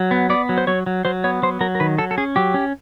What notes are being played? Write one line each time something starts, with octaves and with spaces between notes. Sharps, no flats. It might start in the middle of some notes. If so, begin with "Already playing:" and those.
Already playing: F#3
B3
B3 D5
F#3
C5
F#3 C#5
F#3
F#3 C5
B3 C#5
F#3 C5
F#3 A#4
A#4
D#3 B4
F#3 A4
A4
C#4 G#4
F#3 G4
C#4